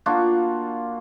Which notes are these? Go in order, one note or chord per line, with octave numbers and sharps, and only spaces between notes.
A#3 D4 F4 F#4